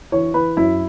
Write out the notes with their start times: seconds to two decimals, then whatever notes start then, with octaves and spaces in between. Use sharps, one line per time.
0.12 E3 C#5
0.34 E3 B4
0.57 F#2 E4